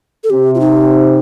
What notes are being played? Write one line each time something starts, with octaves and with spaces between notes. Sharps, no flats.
A4
C3 G4
F4
D#4